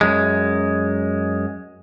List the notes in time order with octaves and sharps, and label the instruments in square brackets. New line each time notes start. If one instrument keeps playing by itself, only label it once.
[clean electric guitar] F#2 G#3